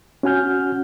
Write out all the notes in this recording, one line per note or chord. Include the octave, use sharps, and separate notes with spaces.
C#4 F#4 F#5 G#5 F6 G6